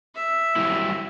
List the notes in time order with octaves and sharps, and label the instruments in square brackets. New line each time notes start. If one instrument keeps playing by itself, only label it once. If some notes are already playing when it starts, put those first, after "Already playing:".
[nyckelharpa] E5
[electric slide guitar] F#3 G3 E4